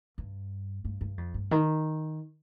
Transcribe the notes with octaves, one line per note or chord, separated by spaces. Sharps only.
G2
G2
G2
F2
G2
D#3